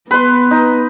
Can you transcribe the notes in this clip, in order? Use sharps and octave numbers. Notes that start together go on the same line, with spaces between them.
B3 B4 C6
D#4